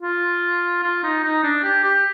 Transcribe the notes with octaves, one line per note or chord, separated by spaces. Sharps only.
F4
F4
D#4
D#4
D4
G4
G4